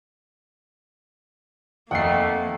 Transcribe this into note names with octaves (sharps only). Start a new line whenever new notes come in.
F2 D#3 A3 A#3 F#5 G5 C7